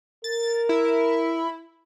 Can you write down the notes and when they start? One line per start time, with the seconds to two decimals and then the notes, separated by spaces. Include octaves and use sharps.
0.24 A#4 A6
0.69 E4